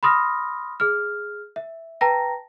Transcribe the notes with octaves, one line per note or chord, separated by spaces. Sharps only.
B5 C6 D#6 F6 A#6
G#4 F6
E5
B4 G5 A5 A#5 A#6